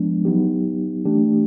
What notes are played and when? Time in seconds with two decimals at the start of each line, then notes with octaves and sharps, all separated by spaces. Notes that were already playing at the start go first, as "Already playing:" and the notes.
Already playing: F3 G#3 B3 D4
0.25 F#3 B3 D#4 G4
1.05 E3 A3 D4 G4